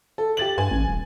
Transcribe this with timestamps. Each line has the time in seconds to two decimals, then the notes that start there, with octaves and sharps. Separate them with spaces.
0.18 A4
0.37 G4 A6 F#7
0.58 G2 G#5
0.71 A1
0.88 D#1